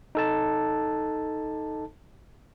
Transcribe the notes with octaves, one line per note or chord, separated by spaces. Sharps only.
D#4 A4 A5